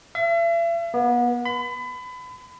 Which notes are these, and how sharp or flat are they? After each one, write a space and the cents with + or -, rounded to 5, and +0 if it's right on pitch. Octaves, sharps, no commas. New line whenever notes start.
E5 +40
B3 -35
B5 +30